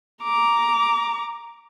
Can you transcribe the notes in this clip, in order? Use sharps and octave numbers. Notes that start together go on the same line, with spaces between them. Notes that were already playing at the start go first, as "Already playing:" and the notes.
A#5 D6